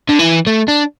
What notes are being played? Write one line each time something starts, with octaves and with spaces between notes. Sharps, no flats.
D3
E3
A3
D4